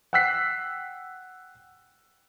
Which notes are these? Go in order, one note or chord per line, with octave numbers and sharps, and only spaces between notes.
F#5 G5 E6 F#6 B6 C7